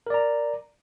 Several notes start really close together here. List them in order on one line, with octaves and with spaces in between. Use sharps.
A#4 D5 A#5